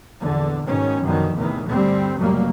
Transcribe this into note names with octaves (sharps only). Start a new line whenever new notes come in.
A#1 E2 D3
G#2 B2 D#3 C#4
F#2 B2 D3 D#3 F3
E2 A2 C3 D#3 E3
D2 G2 D3 G3 C4
F1 C#2 A2 F#3 G3 A#3